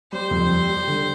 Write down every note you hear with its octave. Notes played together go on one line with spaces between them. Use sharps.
G3 C5
F2
G3
G3
D3